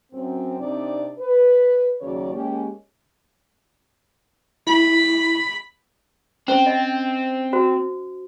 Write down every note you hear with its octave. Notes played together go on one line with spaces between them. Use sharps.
F#2 C4
C3 C4 D4 D#4 D5
B4
D#2 C#3 F#3 C#5 D5
G#3 A#3 C#4 G4
E4 B5
C4 C#4 C5
D#5
F#4 C5